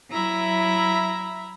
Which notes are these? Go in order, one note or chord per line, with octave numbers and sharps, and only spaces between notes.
F#3 E4 E5 A#5 B5